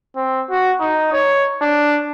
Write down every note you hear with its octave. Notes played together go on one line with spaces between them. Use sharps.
C4
F#4
D#4
C#5
D4